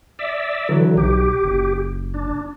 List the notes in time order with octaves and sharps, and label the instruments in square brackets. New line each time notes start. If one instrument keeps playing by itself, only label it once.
[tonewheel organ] D5 E5
[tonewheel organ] D3 E3 [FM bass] F#3
[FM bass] B1 [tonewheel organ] G4
[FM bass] F#1
[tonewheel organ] D4